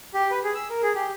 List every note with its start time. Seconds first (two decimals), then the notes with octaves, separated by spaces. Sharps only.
0.14 G4
0.31 B4
0.43 G#4
0.55 E6
0.70 A#4
0.83 G#4
0.96 G4